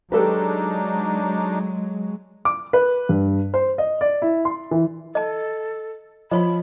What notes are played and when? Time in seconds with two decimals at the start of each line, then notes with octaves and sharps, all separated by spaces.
0.12 F#3 G#3 D4 D#4 G4 A4 B4
2.45 D6
2.73 B4
3.09 G2
3.54 C5
3.78 D#5
4.01 D5
4.22 E4
4.45 C6
4.71 E3
5.15 A4 D#5 A5
6.31 F3 F4 C#5 D#5 B5